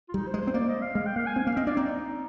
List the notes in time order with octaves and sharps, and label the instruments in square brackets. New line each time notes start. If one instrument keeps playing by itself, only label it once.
[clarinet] F4
[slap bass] G3 [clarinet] D#4
[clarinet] C5
[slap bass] G#3
[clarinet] C5
[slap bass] C4
[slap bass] A#3 [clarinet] D5
[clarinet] D#5
F5
[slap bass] G#3 [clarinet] F5
[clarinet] G5
[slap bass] A#3 [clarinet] F5
[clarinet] G#5
[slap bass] C4
[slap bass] A#3 [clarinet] F5
[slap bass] C4 [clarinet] D#5
[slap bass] D4 [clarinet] D5
[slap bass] C4 [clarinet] D#4